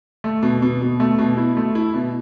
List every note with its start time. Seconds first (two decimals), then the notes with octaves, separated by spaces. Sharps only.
0.24 A3
0.43 B2
0.62 B2
0.82 B2
1.00 A3
1.19 B2
1.37 E4
1.57 A3
1.75 E4
1.94 B2